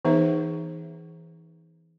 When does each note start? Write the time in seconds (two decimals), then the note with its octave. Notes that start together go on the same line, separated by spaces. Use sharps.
0.05 E3 B3 D#4 G#4 B4 E5